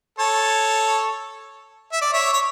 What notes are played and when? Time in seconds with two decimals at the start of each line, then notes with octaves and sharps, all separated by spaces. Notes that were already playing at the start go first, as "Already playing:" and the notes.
0.19 A4 C#5
1.92 E5
2.02 D5
2.12 C#5 E5
2.33 C#5